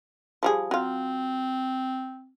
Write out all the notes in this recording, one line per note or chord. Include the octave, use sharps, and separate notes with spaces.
F3 G3 G#4
F#3 C4 F4